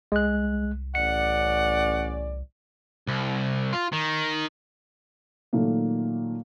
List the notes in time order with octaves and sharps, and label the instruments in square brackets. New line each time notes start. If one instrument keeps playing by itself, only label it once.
[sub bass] C2 [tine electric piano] G#3 F#6
[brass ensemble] A1 C#4 D5 [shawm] F#5 [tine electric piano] C#7
[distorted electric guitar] C2
F4
D#3
[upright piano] A#2 D#3 F#3 A3 A#3